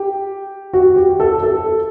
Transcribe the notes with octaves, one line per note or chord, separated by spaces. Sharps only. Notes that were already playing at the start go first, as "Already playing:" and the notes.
Already playing: G4
F#4
G4
A4
A4